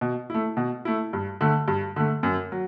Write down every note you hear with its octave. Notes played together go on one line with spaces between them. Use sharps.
B2
A3 E4
B2
A3 E4
G2
D3 A3
G2
D3 A3
F#2
F#3